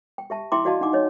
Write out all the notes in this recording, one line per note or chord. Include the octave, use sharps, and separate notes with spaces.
G5
G4 E5 A5
E4 E5 G5 A#5 C6 D6
F#4 D5 D#5 F5 A5
D4 D#4 F#5 D6
D4 C#5 D#5